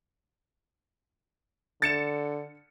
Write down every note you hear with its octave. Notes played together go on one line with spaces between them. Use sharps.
D3 A6 C#7 E7